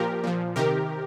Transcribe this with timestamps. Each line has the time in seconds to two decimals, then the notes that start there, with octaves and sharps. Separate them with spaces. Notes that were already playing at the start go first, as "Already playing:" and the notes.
Already playing: A#2 F3 G4 A#4
0.24 A#2 F3
0.56 C3 D#3 G4 A#4